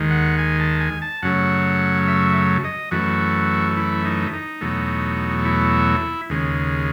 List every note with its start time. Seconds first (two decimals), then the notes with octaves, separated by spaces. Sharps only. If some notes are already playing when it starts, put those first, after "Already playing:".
Already playing: D#2 D#3 G#3
0.11 F#5
0.39 G#5
0.60 A5
0.80 G#5
1.02 A5
1.22 F#2 C#3 F#3 A3 F#5
2.08 E5
2.64 D#5
2.91 F#2 E3 A3 F#4
3.77 E4
4.05 D#4
4.33 D#4
4.61 E2 B2 F#3 A3
5.45 E4
6.30 D#2 C#3 G#3